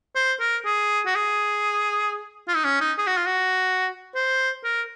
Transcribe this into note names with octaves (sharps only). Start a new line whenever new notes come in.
C5
A#4
G#4
F#4
G#4
F4
D#4
C#4
D#4
G#4
F#4
F4
F#4
C5
A#4